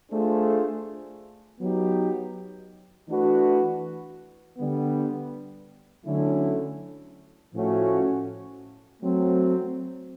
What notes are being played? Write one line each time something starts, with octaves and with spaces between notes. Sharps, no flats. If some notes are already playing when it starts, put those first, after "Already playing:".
A3 D4 F4 G#4 C5
F#3 B3 D#4 G4
E3 A3 D4 F#4 B4
D3 G3 B3
D3 F#3 A3 C#4 E4
A2 F3 A3 C#4 F#4
F#3 A3 C4